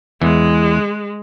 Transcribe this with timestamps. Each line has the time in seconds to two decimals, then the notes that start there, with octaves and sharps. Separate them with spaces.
0.22 E2 E3 G#3